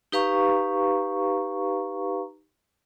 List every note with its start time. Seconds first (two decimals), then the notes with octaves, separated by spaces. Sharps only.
0.12 D#4 G4 B4 F5 A#5 C#6